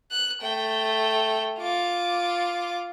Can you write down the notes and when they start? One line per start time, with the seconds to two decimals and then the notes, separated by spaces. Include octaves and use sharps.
0.12 F#6
0.42 A3 G5
1.58 F4 D6